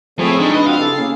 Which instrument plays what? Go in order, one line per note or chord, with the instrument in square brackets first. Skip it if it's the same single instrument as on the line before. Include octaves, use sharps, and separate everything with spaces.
[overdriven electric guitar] A2 [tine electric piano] F3 [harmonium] C4 A4 C#5 [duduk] G#4
[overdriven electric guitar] G3 G#3 [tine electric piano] D4 [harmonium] D#4
[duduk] B4 [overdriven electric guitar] D#5
[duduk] C4 [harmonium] F4 F#4 F#5 [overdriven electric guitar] F5
[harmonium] C#3 E4 G4 [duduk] A4
[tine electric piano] A#3 C#4 [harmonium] G#4